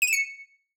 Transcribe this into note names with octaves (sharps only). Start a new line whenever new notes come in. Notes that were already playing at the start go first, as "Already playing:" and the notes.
D#7
E7
C#7